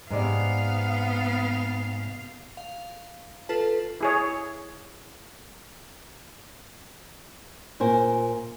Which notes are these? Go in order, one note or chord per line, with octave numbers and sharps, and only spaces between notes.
G#2 C3 B3 D5 F5
F5
F4 A4 B4 A5
E4 G#4 C#5
A#2 A#4 C5 G#5